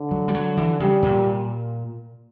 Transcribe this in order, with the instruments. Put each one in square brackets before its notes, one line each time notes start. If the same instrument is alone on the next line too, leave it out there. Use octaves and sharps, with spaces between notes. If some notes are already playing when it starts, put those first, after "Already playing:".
Already playing: [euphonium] D3
[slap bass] F#3
G3
F#3
E3
[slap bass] C#3 [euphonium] G3
[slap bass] A#2